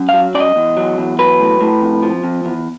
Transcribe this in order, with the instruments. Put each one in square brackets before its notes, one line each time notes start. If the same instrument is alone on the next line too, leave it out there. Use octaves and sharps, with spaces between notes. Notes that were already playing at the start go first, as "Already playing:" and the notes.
Already playing: [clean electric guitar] F#2
F5
F#3
F#2 D5
D#5
E2
F#3
E2
F#3 B4
A2
A2
F2
F3
F2
E2